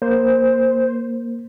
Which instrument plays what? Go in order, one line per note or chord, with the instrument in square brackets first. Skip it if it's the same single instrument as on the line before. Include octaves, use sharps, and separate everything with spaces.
[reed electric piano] A#3 [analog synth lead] C5